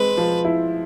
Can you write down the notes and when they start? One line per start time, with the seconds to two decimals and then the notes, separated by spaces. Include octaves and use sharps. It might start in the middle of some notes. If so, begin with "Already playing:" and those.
Already playing: G#3 C4 B4
0.17 F3
0.45 E4